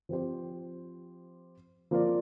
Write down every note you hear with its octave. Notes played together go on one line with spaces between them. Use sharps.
F3 C4 G4 C5
F3 A#3 F4 A#4 D5